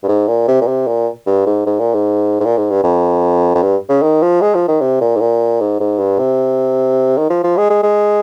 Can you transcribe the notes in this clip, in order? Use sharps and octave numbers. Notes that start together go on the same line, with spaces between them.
G2
G#2
A#2
C3
A#2
C3
A#2
G2
G#2
G#2
A#2
G#2
G#2
A#2
G#2
G2
F2
F2
G2
C#3
D#3
F3
G#3
F3
D#3
C3
A#2
G#2
A#2
G#2
G#2
G2
C3
D#3
F3
F3
G#3
G#3
G#3